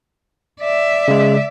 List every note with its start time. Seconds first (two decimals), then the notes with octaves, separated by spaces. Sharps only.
0.60 D5 E5
1.08 C#3 G#3